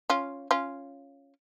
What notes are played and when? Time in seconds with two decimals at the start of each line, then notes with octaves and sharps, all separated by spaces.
0.10 C#4 F4
0.51 C#4 F4